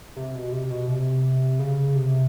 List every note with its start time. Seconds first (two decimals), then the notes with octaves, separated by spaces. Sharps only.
0.16 C3
0.35 B2
0.52 C3
0.70 B2
0.87 C3
1.59 C#3
1.96 C3